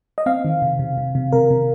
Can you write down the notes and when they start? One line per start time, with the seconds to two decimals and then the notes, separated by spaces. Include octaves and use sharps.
0.18 D#5
0.26 C4 F5
0.45 D#3
0.62 C3
0.79 C3
0.98 C3
1.15 C3
1.32 C3 A#4
1.50 C3